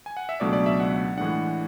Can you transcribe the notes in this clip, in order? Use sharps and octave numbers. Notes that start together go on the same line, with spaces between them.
G#5
F#5
E5
C#2 B2 F#3 A3 D4 D5
D5
E5
F#5
A2 E3 G#3 D4 F#5